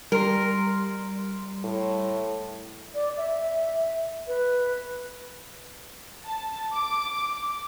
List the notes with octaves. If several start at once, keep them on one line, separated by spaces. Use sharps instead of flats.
G3 A#4 C6
A2
D5
E5
B4
A5
D6